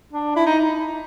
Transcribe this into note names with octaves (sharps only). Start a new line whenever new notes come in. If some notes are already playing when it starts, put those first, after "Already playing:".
D4
E4
D#4